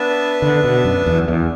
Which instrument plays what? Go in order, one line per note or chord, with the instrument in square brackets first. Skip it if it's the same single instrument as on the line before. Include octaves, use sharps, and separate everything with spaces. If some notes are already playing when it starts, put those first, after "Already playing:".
Already playing: [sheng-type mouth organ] B3 D4 B4 E5 A5
[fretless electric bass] D3
B2
F#2
E2
E2